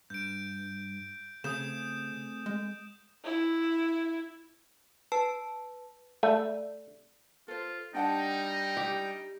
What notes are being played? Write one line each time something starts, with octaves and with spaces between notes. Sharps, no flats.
G2 G6 D7
C#3 A3 C4 G#4 D#6 G6 E7
G#3
E4
B4 A5
A3 D5
F4 A4 C5
G3 D4 D#4 F#5 G5 A5
G4